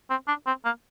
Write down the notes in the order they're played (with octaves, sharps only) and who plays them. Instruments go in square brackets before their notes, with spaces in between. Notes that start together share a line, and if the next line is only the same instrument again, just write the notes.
[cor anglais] C4
D4
C4
A#3